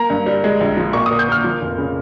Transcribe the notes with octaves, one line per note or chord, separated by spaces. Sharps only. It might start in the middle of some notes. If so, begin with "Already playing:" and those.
Already playing: A#3 A#5
G2
G3
G#3
A#1
F3
A#2 C#6
A#2 D#6
G6
A#3 F6
F3
F1
C#3